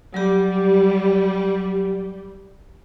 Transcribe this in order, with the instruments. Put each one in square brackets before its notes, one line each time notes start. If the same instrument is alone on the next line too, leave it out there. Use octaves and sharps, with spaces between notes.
[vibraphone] F#3 G4 [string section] G3